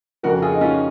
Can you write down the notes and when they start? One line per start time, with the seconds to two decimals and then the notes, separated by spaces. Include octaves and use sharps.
0.23 F2 C#3 F3 F#4 A#4
0.42 F4 G#4
0.55 D#4
0.61 C#4 F4